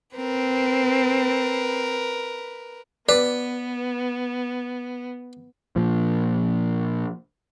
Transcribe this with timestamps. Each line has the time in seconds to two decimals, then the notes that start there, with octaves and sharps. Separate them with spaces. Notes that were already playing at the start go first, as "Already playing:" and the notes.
0.17 C4 A#4 B4
3.09 B3 B4 D5
5.76 A#2 F3